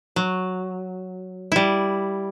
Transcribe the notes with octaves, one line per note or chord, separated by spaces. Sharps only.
F#3
G3 E4